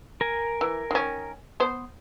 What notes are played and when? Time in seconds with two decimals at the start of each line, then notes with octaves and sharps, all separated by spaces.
0.21 A#4 G#5
0.61 E3
0.91 D#3 C#4
1.60 B3 C5